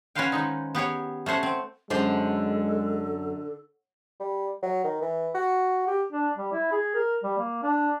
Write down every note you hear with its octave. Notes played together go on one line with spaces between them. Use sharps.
C#4 F#4 B4 C5 F5 G5
D#3 G#3 D#4
B3 G4 G#4 C#5
A3 C#4 C5 F#5
C4
F#2 D3 G#3 A4 C5
G3
F#3
D#3
E3
F#4
G4
D4
G3
E4
G#4
A#4
G3
A#3
D4